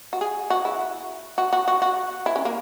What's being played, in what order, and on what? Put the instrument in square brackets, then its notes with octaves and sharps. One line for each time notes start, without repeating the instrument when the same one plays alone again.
[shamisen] F#4
G#4
F#4
E4
F#4
F#4
F#4
F#4
E4
C#4
A#3